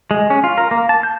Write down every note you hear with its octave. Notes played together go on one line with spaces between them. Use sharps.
G#3
C#4
F4
A#4
A#3
A5
G6